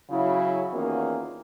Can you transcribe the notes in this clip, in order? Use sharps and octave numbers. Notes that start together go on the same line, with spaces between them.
C#3 F#3 E4
E2 D#3 A#3 C#4 F4 F#4